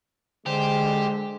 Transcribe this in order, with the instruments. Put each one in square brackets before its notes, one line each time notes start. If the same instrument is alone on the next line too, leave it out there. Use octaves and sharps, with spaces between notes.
[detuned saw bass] D3 [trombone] G#3 [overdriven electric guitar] G4 [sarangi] C5